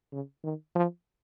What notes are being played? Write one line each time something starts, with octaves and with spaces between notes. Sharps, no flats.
C#3
D#3
F3